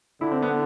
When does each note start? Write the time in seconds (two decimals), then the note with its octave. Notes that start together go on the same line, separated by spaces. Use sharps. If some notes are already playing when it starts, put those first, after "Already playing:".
0.21 D3 E4
0.32 C4
0.42 B3